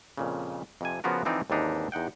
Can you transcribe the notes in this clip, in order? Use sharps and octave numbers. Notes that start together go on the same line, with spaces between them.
F2 A#2 C#3
F2 C3 G#5
C#3 F3 B3 F4 F#4 A#4
D3 E3 F3 C4 D#4 D5
D#2 G#2 E3 C4 D4 D#4
E2 D#4 F#5 G5